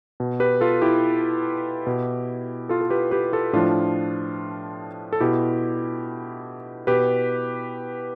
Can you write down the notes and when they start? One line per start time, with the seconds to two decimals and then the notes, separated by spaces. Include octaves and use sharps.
0.20 B2
0.40 G4 B4
0.61 F4 A4
0.82 E4 G4
1.87 B2
2.69 F4 A4
2.81 A4
2.90 G4 B4
3.11 G4 B4
3.33 F4 A4
3.53 A2 F3 D4 F4
5.13 A4
5.20 B2 E4 G4
6.87 B2 G4 B4